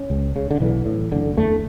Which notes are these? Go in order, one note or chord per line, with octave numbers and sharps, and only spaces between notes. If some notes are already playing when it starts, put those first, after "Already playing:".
Already playing: C#4
C#2
C#3
D3
B1 E3
A2
F#1 D3
E2 D3 A3